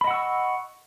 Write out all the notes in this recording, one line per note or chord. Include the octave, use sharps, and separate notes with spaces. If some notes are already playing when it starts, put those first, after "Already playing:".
D#5 F#5 B5 C#6 E6